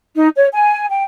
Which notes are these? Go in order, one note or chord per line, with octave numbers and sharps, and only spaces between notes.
D#4
C#5
G#5
G5